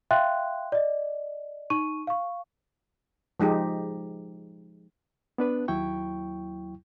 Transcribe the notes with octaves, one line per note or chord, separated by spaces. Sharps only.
E5 F5 G5 C6 F#6
D5 D#5
D#4 C#6 D#7
F5 C#6
F3 G#3 D#4 G4
B3 D4 B4
D#2 F#3 E4 G5 C#6